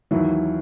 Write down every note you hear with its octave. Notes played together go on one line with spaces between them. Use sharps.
D#2 D#3 E3 F#3 E4